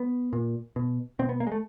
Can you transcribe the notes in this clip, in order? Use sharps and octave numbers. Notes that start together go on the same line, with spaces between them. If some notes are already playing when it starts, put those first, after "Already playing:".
Already playing: B3
A#2
B2
B2 C4
B3
A#3
G#3
A3